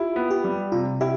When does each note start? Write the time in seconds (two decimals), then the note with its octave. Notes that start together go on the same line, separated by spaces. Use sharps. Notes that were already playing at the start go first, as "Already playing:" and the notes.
Already playing: E4 F4 G4
0.16 B3
0.31 G4
0.44 G3
0.72 C3 F4
1.01 E4 G4